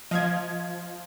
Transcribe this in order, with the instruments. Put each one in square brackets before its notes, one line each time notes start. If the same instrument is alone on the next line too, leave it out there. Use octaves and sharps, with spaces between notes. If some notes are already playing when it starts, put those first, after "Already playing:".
[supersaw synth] F3 [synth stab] D#5 F5 G#6